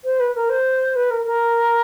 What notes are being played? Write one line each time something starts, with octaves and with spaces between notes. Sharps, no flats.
C5
B4
A#4
C5
B4
A#4
A#4